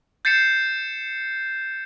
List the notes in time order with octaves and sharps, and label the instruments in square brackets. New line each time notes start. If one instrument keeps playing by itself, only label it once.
[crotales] G6 A6 C7 C#7 E7